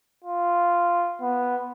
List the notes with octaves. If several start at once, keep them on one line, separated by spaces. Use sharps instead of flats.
F4
B3